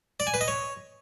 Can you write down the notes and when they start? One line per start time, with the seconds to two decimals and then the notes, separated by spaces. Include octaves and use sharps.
0.20 D5
0.27 G#5
0.34 B4
0.41 D#5
0.48 C#5